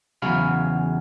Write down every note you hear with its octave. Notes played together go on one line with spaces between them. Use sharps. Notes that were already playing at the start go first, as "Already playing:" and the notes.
E2 C#3 F#3 F5 B5